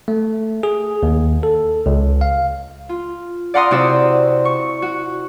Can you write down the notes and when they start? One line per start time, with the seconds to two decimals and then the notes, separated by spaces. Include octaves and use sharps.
0.08 A3
0.63 G#4
1.03 D#2
1.43 A4
1.86 C#2
2.21 F5
2.89 F4
3.54 D5 F5 F#5 A#5 C6 D#6
3.71 C3 C4 E4 F#4 D5 E6
4.45 C#6
4.82 F#4